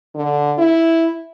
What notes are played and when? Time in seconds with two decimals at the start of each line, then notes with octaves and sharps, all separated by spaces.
0.15 D3
0.58 E4